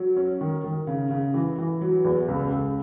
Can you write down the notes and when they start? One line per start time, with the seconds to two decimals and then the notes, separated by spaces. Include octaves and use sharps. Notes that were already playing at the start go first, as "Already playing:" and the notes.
Already playing: F#3
0.17 C#4
0.41 D#3
0.64 D#3
0.87 C#3
1.11 C#3
1.34 E3
1.58 E3
1.81 F#3
2.04 E2
2.28 C#2
2.51 C#2